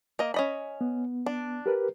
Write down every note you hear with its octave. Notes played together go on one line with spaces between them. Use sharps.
A#3 D#5
C#4 D#5 B5
B3
D4
G4 A#4 B4